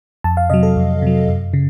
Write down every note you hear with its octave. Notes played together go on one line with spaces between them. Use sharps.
F2 A5
F5
C3 F#3 D#5
A4
F2
C3 F#3
F#2
C#3